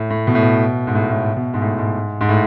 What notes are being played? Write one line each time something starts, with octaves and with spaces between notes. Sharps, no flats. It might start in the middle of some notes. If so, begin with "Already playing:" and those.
Already playing: A2
A2
B2
A2
B2
G#2
A2
A2
B2
G#2
A2
G#2
G#2
A2